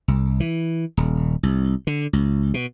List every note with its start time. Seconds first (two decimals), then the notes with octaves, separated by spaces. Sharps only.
0.08 C2
0.40 E3
0.97 D#1
1.43 C2
1.87 D3
2.13 C#2
2.54 B2